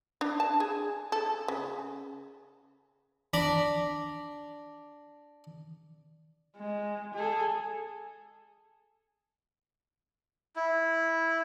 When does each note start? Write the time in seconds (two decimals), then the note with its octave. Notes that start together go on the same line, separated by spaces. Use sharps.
0.21 D4
0.40 A5
0.60 G#4
1.12 A4
1.48 C#3
3.34 D4 A#5 B5 D6
6.57 G#3
7.14 G#4 A4
10.56 E4